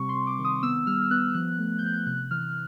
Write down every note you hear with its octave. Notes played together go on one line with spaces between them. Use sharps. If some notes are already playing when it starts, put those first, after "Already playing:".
Already playing: C3 G3 C4 C#6
C6
C3
D6
D#3
D#6
B3 E6
G3 F6
F6
B3 F#6
F3 F#6
A3
G6
F3 F#6
G6
C3 F#6
E3 F6